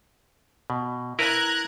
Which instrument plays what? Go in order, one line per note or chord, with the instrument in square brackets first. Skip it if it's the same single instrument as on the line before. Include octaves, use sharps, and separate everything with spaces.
[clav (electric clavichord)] B2
[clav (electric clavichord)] E4 A#4 B4 [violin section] A#5 F#6 G#6